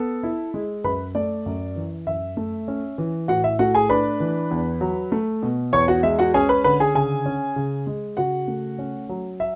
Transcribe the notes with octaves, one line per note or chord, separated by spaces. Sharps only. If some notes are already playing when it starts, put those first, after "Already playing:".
Already playing: B3 A4
E4
G#3
F#2 B4 B5
A3 D5
F#2
E3
F#2 E5
A3
C#4
E3
A2 F#4 F#5
E5
A3 F#4 F#5
G#4 G#5
D4 B4 B5
E3
E2
F#3
A3
B2
E2 C#5 C#6
F#4 F#5
G#3 E5
F#4 F#5
C#4 G#4 G#5
B4 B5
D3 B4 B5
G#4 G#5
C#3 G#4 G#5
C#4
C#3
G#3
C#3 F#4 F#5
A3
C#4
F#3
E5